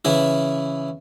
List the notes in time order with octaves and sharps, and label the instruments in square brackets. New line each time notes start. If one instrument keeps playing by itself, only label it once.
[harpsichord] C#3 E3 E4